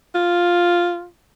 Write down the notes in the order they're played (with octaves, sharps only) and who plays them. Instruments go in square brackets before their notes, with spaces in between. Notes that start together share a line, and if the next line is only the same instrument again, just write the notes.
[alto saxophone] F4